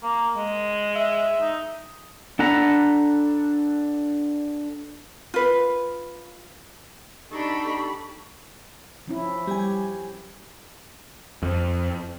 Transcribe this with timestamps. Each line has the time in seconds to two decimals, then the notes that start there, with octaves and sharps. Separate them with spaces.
0.03 A#3
0.36 G#3
0.96 E5
1.40 D#4
2.39 D4 A4 F#5 A#5 B5
5.34 F4 B4
7.31 D4 D#4 G4 A4 B5 C#6
9.08 F3 C#4 E4
9.47 G3 G4 G#5
11.43 F2